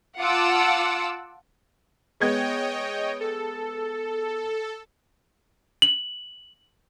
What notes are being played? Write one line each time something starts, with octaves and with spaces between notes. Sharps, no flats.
F4 F#5 A5 D6 E6
G#3 B3 C#5 D#5 G5 G#6
A4
F#7